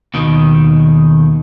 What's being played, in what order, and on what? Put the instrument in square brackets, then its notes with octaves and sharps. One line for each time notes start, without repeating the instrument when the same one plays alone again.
[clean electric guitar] D#2 B2 D#3